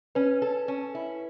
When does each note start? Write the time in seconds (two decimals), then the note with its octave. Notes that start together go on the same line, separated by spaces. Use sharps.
0.15 C#4 B4
0.42 A4
0.68 C#4
0.95 E4